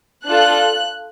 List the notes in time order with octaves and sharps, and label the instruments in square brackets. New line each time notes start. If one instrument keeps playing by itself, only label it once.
[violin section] D4 F4 A4 F#6